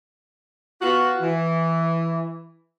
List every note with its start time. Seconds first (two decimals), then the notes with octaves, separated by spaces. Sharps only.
0.81 B3 F4 F#4
1.22 E3